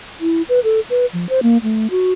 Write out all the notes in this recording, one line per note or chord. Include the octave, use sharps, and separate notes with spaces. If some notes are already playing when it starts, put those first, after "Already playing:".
E4
B4
A4
B4
F3
C5
A#3
A3
F#4